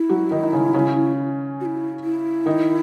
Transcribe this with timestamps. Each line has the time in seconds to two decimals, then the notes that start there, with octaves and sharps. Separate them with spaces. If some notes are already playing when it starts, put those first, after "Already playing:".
Already playing: E4
0.09 F#3 F#4
0.31 D#3 D#4
0.43 D#4
0.53 C#3 C#4
0.74 C#3 C#4
1.60 F#4
1.65 E4
2.04 E4
2.46 D#3 D#4